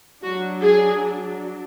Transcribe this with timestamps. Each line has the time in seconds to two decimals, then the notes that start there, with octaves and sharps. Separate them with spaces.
0.23 F#3 D4 F#4
0.64 G#4